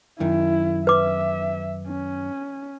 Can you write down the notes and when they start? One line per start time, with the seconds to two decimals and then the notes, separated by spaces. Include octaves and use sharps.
0.20 F#2 D#3 E4
0.87 B4 E5 D6
1.88 C#4